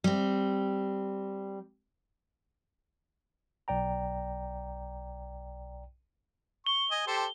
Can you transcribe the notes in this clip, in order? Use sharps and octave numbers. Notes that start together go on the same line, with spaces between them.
G3 C4
B1 D5 G5 A#5
C#6 G7
D#5 G#5
G4 A4 C5